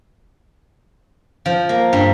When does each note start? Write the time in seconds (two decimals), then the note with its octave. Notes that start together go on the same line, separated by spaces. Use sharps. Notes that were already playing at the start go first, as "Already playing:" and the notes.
1.46 F3
1.69 A#3
1.93 G2